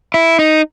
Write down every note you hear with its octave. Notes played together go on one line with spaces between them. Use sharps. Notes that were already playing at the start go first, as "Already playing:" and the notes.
E4
D#4